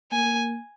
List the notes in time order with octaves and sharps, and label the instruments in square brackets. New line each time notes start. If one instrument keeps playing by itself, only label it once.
[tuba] A#3 [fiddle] G#5